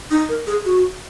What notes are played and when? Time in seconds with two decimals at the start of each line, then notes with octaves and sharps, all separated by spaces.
0.10 D#4
0.29 A#4
0.47 G#4
0.65 F#4